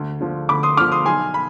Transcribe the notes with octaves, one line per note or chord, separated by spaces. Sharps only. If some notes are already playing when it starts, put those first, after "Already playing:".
Already playing: D2
D3 F3
D2 B5 D6
C6 D#6
D3 F3 D6 F6
C6 D#6
B1 G#5 C6
B5